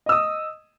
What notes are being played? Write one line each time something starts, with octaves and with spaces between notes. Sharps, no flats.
D#5 D#6 E6